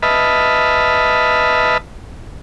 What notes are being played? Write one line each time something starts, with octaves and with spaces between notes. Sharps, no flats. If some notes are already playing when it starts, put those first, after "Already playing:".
B4 D#5 E5 A5 B5 F6